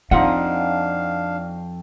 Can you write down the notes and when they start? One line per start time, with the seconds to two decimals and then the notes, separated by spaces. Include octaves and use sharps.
0.11 F2 C4 D4 D#4 F4 F5 F#5